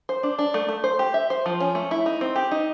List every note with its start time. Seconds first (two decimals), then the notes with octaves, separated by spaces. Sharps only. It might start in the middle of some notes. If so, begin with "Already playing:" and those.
0.09 C5
0.23 D4
0.39 D4
0.54 A3
0.69 A3
0.84 C5
0.99 G4
1.14 E5
1.30 C5
1.46 F3
1.60 C#4
1.75 A3
1.91 E4
2.06 D#4
2.21 C4
2.35 G4
2.51 D#4